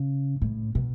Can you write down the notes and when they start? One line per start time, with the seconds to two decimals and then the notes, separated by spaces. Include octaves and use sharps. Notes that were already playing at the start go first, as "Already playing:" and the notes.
Already playing: C#3
0.42 A2
0.75 B2